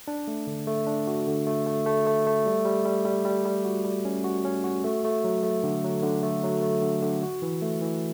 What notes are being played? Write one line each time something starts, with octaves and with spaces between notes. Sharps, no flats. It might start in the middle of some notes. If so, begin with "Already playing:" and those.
D4
A3
D3
A3
D4
F#4
D3
A3
A3
A3
A3
A3
G3
G3
G3
G3
G3
G3
F#4
G3
C#4
F#4
C#4
F#4
A3
A3
F#3
A3
D3
F#3
D3
A3
F#3
A3
D3
D3
F#4
E3
A3
E3